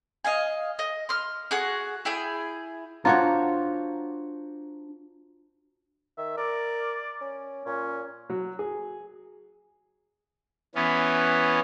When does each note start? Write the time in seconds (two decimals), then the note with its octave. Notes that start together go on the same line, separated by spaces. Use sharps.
0.25 D#5 F5 G#5
0.79 D#5
1.09 C6 F6
1.51 F#4 G#4 F#5
2.05 E4 G#4 G5 G#5
3.05 D4 F4 F#4 C5 C#5 A#5
6.18 D#3 E5
6.37 A#4 D5
7.21 C#4
7.66 A#2 C#4
8.29 F#3
8.59 G#4
10.75 E3 B3 C#4